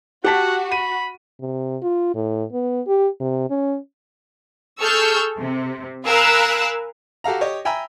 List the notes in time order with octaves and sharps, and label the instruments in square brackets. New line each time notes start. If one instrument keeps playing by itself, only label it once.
[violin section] F#4 [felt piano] G4 A5 B6 [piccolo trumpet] F#5
[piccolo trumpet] B5 [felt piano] D#7
[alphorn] C3
F4
A2
B3
G4
C3
C#4
[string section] G#4 A4 C#6 E6 F6 G6
C3
A#4 F5 G#5 B5 E6 F#6
[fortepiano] F#4 G4 A4 F5 A#5
G4 C#5 D#5
E5 G5 G#5 A#5 B5 E6